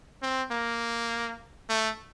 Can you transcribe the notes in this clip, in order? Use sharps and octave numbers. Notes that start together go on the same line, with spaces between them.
C4
A#3
A3